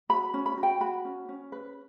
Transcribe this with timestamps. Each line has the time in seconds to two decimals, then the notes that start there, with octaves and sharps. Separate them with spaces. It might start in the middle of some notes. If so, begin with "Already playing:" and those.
0.09 F#4 B5
0.34 C#4
0.46 B5
0.57 F#4
0.63 G5
0.81 F#4 B5
1.05 C#4
1.29 C#4
1.52 B4